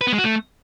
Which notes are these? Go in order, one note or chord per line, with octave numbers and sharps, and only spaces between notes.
B4
B3
G#3
F#4
A3